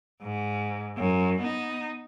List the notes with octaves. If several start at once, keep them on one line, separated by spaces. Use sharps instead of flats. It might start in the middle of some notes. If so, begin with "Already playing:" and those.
G#2
F#2
B3 D#4